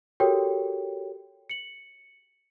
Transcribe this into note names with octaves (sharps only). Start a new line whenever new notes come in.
F#4 G4 A4 A#4 C#5 G5
C#7 F#7